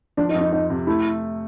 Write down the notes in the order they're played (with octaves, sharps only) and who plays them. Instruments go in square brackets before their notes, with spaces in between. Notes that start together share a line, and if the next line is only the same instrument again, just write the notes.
[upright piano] F3 [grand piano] D4
[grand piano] D#4
[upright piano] F2
[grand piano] D#4
[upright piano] F2 [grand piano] D#4
[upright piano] C3
[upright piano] A3 [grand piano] E4